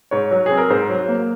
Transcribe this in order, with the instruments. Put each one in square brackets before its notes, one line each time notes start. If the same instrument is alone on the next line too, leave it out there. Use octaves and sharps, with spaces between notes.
[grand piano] G#2 C#5
F#3
C4 G#4
A#4
G#2 C5
F#3
A#3